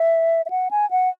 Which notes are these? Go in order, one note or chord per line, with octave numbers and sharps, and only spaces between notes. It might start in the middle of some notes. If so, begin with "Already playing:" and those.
Already playing: E5
E5
F#5
G#5
F#5